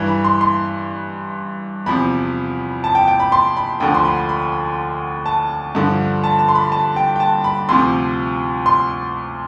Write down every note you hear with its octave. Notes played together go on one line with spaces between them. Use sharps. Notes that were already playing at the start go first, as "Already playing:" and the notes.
Already playing: G2 E3
B5
C6
C6
E2 C3 F3 B5
A5
G5
G5
B5
C6
B5
D2 D3 F3 G5
C6
B5
B5
A5
G2 D3 F3
A5
A5
C6
B5
A5
G5
G5
A5
B5
D2 C3 F3 C6
C6